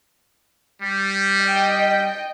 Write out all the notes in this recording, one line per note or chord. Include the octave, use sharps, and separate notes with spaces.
G3
D#5 G5